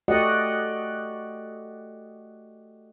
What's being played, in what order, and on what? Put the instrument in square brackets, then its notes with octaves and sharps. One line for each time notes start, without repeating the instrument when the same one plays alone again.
[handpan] A3 F#4 G4 D5 D#5 F#5